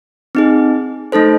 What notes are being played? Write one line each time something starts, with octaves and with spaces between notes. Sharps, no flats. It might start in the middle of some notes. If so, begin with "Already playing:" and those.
C4 D#4 G#4
A3 D#4 A4 C5